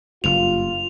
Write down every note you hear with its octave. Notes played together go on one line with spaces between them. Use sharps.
F#1 G2 F4 F7